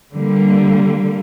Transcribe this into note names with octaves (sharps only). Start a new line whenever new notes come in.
D3 G3 A#3